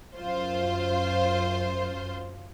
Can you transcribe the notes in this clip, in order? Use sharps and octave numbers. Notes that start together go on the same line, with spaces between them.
F#2 F4 C5